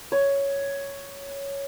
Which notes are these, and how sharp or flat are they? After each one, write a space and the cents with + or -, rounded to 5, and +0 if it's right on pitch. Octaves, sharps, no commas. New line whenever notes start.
C#5 +5